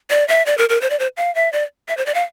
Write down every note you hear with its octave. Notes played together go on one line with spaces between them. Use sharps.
D5
E5
D5
A#4
A#4
C5
D5
C5
F5
E5
D5
E5
C5
D5
F5